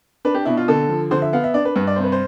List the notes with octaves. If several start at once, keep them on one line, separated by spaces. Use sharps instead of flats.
D4 B4
G4
B2 E4
F4
D3 A4
F3
D3 C5
E5
B3 F5
E5
D4 D5
B4
G2 B4
D5
C3 C5
B4
C5